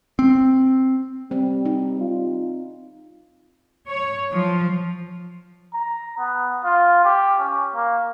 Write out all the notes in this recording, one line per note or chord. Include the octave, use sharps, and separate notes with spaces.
C4
G3 C4
D#4
F4
C#5
F3
A#5
B3
F4
G4
C#4
A#3